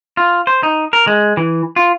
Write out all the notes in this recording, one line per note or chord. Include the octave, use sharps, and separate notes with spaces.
F4
C5
D#4
A#4
G#3
E3
F4